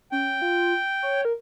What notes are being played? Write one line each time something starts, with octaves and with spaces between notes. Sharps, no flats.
C#4 G5
F4
C#5
A#4